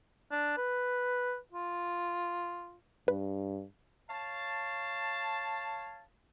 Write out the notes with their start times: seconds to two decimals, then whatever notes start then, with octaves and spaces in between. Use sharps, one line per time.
0.31 D4
0.57 B4
1.53 F4
3.08 G2 B4
4.10 C#5 F5 A5